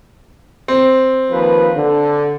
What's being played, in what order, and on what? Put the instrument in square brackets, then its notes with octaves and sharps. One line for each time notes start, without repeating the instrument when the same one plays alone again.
[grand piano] C4
[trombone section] D#2 F3 B4
D3